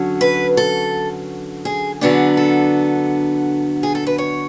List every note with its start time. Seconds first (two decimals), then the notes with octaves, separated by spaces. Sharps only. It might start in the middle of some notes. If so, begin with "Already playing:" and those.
Already playing: D3 F#3 C#4
0.21 B4
0.57 A4
1.65 G#4
2.01 D3 F#3 B3 D4 G#4
2.37 A4
3.83 G#4
3.95 A4
4.07 B4
4.18 C#5